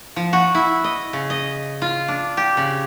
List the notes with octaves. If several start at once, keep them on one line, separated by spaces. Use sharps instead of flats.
F3
F#4
E4
D#5
C#3
D#5
F4
D4
G4
C#3